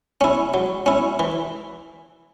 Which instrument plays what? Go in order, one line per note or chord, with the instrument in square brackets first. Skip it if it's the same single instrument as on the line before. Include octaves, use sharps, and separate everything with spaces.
[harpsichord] C#4 E4
F#3
C#4 E4
E3